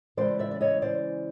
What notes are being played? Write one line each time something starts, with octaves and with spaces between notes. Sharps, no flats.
C#3 E3 G#3 C#4 C5 D5
D5 E5
D5
C#5 D#5
C5 D5